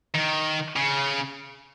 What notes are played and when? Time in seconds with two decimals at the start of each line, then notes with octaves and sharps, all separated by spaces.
0.15 D#3
0.76 C#3